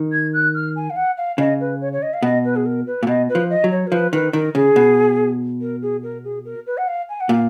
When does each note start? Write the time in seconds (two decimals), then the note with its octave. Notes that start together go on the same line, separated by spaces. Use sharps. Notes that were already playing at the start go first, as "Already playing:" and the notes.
Already playing: D#3
0.12 G#6
0.33 F#6
0.54 F6
0.75 G#5
0.89 F5
0.96 F#5
1.17 F5
1.38 C#3 D#5
1.60 B4
1.81 C#5
1.92 C#5
2.02 D#5
2.13 F5
2.22 B2 D#5
2.44 B4
2.55 G#4
2.65 A#4
2.86 B4
3.03 A#2
3.07 B2 D#5
3.28 B4
3.35 F3
3.49 D#5
3.64 F#3
3.71 C#5
3.87 A#4
3.92 F3 B4
4.13 D#3 B4
4.33 D#3 A#4
4.55 C#3 G#4
4.76 B2
5.61 A#4
5.82 G#4
6.03 A#4
6.24 G#4
6.45 A#4
6.66 B4
6.77 F#5
6.87 F5
7.09 G#5
7.20 F#5
7.29 A#2 F5